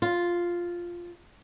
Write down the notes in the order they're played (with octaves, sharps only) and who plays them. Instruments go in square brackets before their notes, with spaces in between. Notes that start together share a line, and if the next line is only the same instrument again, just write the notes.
[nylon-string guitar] F4